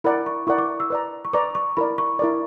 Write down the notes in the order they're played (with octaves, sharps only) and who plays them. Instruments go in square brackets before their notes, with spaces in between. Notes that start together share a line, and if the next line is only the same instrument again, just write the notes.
[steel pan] E4 A#4 D5 F#5 [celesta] B5
[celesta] C#6
[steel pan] E4 A#4 D5 F#5 [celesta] C#6
[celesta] D6
E6
[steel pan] B4 D5 A#5
[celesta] C#6
[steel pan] B4 D5 A#5 [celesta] D6
[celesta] C#6
[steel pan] E4 A#4 D5 [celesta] B5
[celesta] C#6
[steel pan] E4 A#4 D5